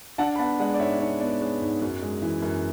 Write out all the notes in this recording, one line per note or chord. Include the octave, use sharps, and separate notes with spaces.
D4 F#5 A5
B5
B3 F#5 A5
G#3 D5 F#5
D5
G#2 C#5 E5
D4 C#5
B3 D5
G#3 C#5
G#2
F#2
G#3
E3
F#2